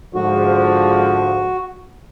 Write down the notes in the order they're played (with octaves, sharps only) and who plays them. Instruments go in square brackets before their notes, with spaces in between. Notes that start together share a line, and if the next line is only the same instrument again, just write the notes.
[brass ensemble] G#2 D3 F3 [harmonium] F#4